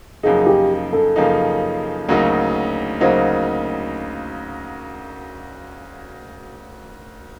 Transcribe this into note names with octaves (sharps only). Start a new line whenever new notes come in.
F#2 C#3 F3 A#3 D#4 G#4
G4
A4
F#2 C#3 F3 A#3 D#4
D2 C#3 F#3 A#3 D#4
D2 C#3 F#3 A#3 D#4 C5